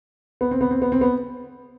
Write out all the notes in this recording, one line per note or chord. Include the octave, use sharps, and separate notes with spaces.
B3
C4
B3
C4
B3
C4
B3